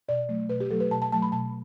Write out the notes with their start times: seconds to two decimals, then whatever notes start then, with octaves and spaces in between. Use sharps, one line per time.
0.08 B2 D5
0.29 F#3 A3
0.49 B2 B4
0.60 G4
0.71 F#3 A3 A4
0.80 B4
0.91 B2 A5
1.02 A5
1.12 F#3 A3 A5
1.22 B5
1.32 B2 A5